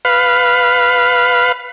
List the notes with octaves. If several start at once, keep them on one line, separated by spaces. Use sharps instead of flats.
B4 F5